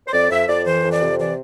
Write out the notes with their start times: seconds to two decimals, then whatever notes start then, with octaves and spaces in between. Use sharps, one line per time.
0.07 C5
0.13 F2 D5
0.30 F2 E5
0.48 F2 D5
0.65 E3 C5
0.84 F2
0.92 D5
1.01 C3
1.19 E3 D5